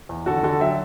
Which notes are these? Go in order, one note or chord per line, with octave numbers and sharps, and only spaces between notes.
E2
D3 F#4 A4
D3 F#4 A4
F#3 E5 G5